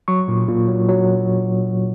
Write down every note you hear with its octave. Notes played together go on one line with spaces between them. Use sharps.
F#3 C#6
A#2
A#2
F#3
F#3